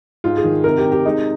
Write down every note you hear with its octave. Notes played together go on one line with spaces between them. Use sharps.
G#2 F4
G#4
D#3
C3 A#4
G4
C3
G4
G#3 D#4